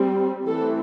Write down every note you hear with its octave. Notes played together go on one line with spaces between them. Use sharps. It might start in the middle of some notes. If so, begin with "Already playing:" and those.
Already playing: G3 C4
E3 A3 C4 A4